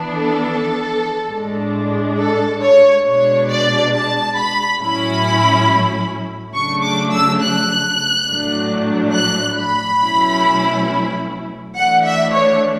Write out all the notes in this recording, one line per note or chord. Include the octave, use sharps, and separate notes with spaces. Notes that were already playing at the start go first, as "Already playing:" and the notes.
Already playing: E3 B3 D4
A4
A2 G#3 D4
A4
C#5
B2 G#3 D4 C#5
D5
A5
B5
A2 F#3 C#4 E4 B5
C#3 F#3 A3 D4 C#6
D6
E6
F#6
A2 F#3 A3 D4
F#6
B5
B2 F#3 A3 C#4 E4
E3 A3 D4 F#5
E5
C#5